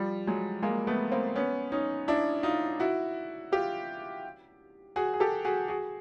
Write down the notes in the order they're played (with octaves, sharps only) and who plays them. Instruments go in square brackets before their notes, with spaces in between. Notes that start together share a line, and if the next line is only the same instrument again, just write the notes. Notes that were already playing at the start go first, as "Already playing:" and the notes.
Already playing: [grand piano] F3 G3
F#3 G#3
G#3 A#3
A3 B3
A#3 C4
B3 C#4
C#4 D#4
D4 E4
D#4 F4
E4 F#4
F4 G4
F#4 G#4
G#4
G4 A4
F#4 G#4
F#4 G#4